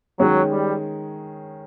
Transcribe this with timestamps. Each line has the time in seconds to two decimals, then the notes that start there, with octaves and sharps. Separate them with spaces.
0.19 D#3 F#3 G#3 C#4
0.52 G3